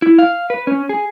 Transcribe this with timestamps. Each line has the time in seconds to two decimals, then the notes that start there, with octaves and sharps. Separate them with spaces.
0.02 E4
0.19 F5
0.50 B4
0.67 C#4
0.89 G#4